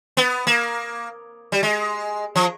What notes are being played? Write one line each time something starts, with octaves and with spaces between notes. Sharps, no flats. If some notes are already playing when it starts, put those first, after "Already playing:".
B3
A#3
G3
G#3
F3